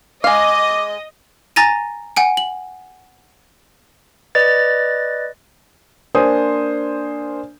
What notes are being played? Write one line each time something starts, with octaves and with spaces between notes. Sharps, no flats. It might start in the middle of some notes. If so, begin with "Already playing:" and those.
G#3 D#5 F5 D6
G#5 A#5 A6 A#6 D#7
F#5 G#5 D7
F#7
B4 D5 D#5 A6
A#3 D4 C5 G#5 D#6